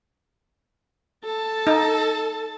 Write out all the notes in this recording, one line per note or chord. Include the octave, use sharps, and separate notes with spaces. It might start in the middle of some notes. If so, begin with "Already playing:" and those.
A4 A5
D#4